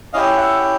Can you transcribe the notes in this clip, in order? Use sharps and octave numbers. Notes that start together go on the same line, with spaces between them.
C#4 E4 G4 D#5 F5
E5 F#5